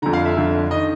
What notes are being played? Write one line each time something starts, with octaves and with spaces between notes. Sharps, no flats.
F2 D3 A#5
F5
E5
F2 D3
D#3 D#5